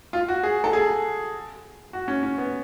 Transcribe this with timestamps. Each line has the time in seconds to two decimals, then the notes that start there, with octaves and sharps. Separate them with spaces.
0.13 F4
0.28 F#4
0.43 G#4
0.64 A4
0.73 G#4
1.93 F#4
2.08 C#4
2.23 C#4
2.38 B3